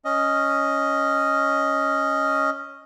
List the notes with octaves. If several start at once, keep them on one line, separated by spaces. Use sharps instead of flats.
C#4 D#5